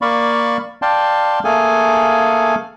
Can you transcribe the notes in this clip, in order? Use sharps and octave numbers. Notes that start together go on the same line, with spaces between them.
A#3 D5 F5 B5 C#6
D5 F5 G5 A5 C6
A3 A#3 G#4 A4 F5 G#5